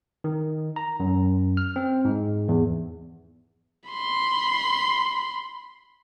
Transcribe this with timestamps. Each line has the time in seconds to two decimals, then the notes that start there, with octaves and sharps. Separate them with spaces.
0.24 D#3
0.76 A#5
1.00 F#2
1.57 F6
1.76 C4
2.05 G#2
2.48 E2
3.90 B5 C6